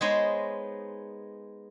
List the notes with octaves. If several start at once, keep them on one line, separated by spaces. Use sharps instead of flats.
G#3 B3 D#4 C5 C#5 D#5